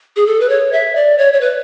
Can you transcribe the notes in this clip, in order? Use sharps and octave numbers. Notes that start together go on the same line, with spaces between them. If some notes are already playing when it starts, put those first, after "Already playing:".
G#4
A4
B4
C#5
E5
D5
C#5
C#5
B4